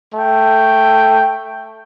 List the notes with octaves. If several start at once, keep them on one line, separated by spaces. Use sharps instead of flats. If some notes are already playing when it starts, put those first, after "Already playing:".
A3 G5